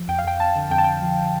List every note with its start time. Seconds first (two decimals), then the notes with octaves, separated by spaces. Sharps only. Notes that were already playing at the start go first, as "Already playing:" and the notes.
Already playing: F3
0.08 F2 G5
0.18 F5
0.24 F2 G5
0.39 F2 A5
0.56 D3
0.70 F2 G5
0.78 A5
0.84 F2 G5
1.02 F3